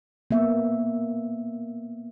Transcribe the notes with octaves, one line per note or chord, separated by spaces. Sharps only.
A#3 B3 E5